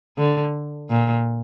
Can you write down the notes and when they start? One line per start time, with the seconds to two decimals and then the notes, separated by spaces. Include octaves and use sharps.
0.18 D3
0.90 A#2